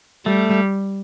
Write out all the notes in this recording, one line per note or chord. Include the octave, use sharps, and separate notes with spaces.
G3 A3